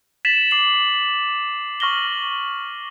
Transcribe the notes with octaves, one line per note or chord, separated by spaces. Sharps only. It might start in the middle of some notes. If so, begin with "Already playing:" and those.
A6 B6 E7 F#7
D6 C7 E7 F#7
C#6 F6 A#6 F#7 G7